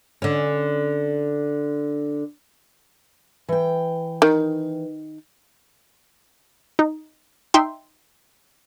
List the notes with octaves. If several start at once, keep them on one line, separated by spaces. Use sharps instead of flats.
D3 C#4
E3 G5
D#3
D#4
D#4 E5 G5 C6